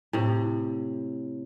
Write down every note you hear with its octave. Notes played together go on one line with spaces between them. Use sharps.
A2 C3